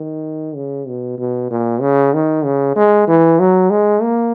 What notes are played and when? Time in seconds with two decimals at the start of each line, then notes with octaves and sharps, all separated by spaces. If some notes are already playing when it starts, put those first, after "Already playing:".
Already playing: D#3
0.55 C#3
0.88 B2
1.19 B2
1.51 A#2
1.81 C#3
2.14 D#3
2.45 C#3
2.76 G#3
3.08 E3
3.40 F#3
3.70 G#3
4.02 A#3